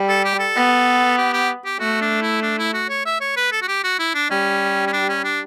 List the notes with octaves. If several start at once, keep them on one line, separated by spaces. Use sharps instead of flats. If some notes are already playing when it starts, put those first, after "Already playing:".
Already playing: G3
A4
G4
A4
B3
G4
G4
G4
A3 F#4
D4
E4
D4
E4
F#4
C#5
E5
C#5
B4
A4
F#4
G4
F#4
E4
D4
G3 C#4
C#4
D4
C#4
D4